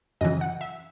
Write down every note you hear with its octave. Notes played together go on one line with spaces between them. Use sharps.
F#2 C#3 E3 D#5
F#5
E5